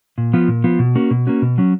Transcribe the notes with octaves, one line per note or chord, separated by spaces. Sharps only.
A#2
F3 B3 F4
A#2
F3 B3 F4
B2
A#3 C#4 F#4
B2
A#3 C#4 F#4
B2
F#3 C#4